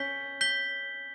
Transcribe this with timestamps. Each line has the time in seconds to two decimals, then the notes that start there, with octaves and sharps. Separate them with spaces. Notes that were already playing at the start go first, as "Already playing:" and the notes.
Already playing: C#4 G6 B6 G7
0.41 G6 B6 G7